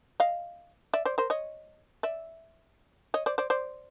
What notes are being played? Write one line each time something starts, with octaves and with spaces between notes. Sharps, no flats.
D#5 F5
D5 E5
C5 D5
A#4 C5
C#5 D#5
D5 E5
C#5 D#5
C5 D5
C5 D5
C5 D5